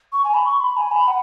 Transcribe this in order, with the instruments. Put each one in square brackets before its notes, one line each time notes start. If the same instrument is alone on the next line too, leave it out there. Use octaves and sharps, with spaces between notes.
[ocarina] C#6
G#5
B5
C#6
B5
G#5
B5
F#5